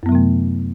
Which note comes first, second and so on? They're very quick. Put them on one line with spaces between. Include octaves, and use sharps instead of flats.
F#2 B3 F#3 C3 A3